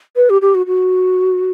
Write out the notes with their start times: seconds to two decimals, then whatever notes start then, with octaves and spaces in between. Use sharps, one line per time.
0.16 B4
0.30 G4
0.42 G4
0.55 F#4
0.66 F#4